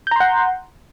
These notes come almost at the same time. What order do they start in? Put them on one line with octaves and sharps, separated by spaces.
G6 A#5 C6 F#5